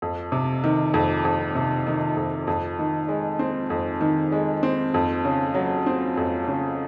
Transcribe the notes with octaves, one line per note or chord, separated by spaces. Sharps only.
F2
C3
D#3
F2
F2
C3
D#3
F2
F2
D#3
G#3
C4
F2
D#3
G#3
C4
F2
C#3
F#3
C4
F2
C#3